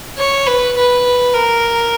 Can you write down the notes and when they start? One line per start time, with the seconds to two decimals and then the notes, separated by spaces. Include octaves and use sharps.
0.18 C#5
0.47 B4
0.77 B4
1.33 A#4